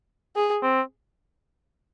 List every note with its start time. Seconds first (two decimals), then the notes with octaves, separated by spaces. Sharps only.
0.36 G#4
0.63 C4